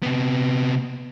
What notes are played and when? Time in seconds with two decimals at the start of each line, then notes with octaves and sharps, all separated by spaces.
0.03 C3 B3